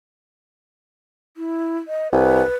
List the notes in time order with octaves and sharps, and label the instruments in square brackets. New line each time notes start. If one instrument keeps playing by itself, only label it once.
[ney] E4
D#5
[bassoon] C2 [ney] B4